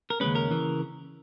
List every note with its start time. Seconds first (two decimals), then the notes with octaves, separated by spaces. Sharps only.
0.10 A#4
0.20 D#2 C#3 G#3 C#4 B4
0.35 A#4
0.51 C#3 E3